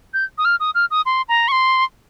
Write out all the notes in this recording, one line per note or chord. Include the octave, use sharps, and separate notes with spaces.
G6
D#6
F6
D#6
F6
D#6
C6
A#5
C#6
C6